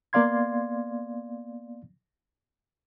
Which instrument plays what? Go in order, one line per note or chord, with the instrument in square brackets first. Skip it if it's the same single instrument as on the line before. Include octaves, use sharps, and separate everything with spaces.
[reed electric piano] A#3 B3 D5 F5 C6 G#6